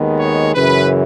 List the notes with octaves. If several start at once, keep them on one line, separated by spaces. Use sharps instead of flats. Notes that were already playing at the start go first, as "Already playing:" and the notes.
Already playing: D#2 D#3 G#3 B3
C#5
F#2 C#3 E3 B4